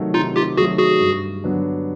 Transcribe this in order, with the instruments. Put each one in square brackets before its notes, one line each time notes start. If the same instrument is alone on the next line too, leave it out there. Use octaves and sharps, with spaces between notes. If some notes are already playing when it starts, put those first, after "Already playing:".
Already playing: [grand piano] C3 D#3 F#3 A3
[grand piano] C3 [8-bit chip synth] D#4 F4
[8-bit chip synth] F4 G4
[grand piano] D#3 F#3 A3 [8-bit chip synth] F#4 G#4
[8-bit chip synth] F#4 G#4
[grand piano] G2
D3 F#3 B3 D4